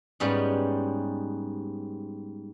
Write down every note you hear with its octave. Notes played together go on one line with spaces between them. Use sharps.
G#2 G3 B3 C#4